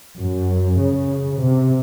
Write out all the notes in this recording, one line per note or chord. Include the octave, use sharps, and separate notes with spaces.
F#2
C#3
C3